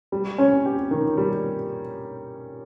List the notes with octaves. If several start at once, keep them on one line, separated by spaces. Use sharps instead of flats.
G3
C#4
G4
D#3
G3